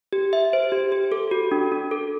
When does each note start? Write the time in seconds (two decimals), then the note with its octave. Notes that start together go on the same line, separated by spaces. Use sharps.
0.13 G4
0.33 E5
0.53 C5
0.72 G4
0.92 G4
1.12 A4
1.31 F#4
1.51 D4
1.72 D4
1.91 A4